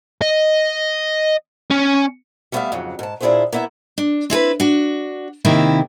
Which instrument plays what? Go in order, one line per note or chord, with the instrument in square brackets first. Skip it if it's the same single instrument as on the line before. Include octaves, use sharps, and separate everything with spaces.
[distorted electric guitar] D#5
C#4
[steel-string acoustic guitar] G3 A3 B3 C#5 E5 F5
F2 G#2 C#3 F#3
G#2 A5
A#2 D4 E4 G#4 A4 C5
A#3 B3 E4 D#5 E5
D4
C4 E4 A4 B4
D4 F#4
C3 D#3 A#3 C4 E4